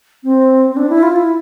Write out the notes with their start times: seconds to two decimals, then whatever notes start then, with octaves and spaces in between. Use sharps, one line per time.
0.24 C4
0.71 C4
0.77 D4
0.90 E4
1.03 F4
1.16 E4